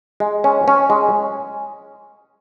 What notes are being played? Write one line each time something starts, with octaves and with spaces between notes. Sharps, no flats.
G#3
C#4
C#4
G#3